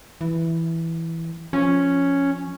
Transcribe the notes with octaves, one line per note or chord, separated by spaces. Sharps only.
E3
F3 C#4